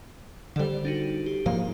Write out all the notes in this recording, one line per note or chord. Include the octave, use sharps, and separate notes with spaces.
D3 G3 A4 C5
D4 D#4 F#4
G4
G#2 F3 A#3 F5